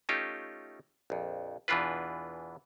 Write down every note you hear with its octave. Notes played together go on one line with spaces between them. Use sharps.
A3 C#4 D#4 F4 G4
A#1 F2
E2 B2 E3 D4 F4 B4